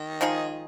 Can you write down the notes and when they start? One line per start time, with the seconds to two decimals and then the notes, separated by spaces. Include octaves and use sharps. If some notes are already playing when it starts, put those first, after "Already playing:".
Already playing: D#3
0.21 F3 G#3 D#4 G#4